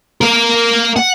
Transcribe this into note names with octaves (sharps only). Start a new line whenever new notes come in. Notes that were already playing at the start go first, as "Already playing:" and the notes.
A#3 A#4
F#5